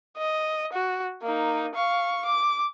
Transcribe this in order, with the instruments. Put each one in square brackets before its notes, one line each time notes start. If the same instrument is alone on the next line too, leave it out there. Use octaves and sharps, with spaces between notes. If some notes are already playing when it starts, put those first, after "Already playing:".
[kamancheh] D#5
F#4
A#3 D#4
F5 C#6
D6